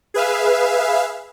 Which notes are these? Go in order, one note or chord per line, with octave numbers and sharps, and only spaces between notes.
G#4 B4 E5 F5